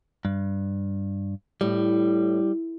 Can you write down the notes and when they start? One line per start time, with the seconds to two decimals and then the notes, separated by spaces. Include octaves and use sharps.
0.25 G2
1.61 A2 G3